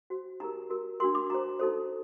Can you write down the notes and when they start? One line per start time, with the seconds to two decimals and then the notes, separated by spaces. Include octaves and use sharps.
0.10 F#4 C5
0.40 D#4 G4 A#4 A#5
0.70 F#4 A#4
1.00 D4 F#4 A#4 C6
1.15 D6
1.30 F#4 C5 A#5
1.59 D#4 F#4 A4 C5